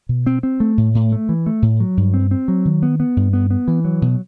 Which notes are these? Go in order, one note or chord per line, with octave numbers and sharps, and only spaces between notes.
B2
C4
C4
A3
A2
A2
A3
E3
A3
A2
F#3
G2
C4
C4
F#3
D#3
B3
B3
G2
B3
B3
E3
F#3
B2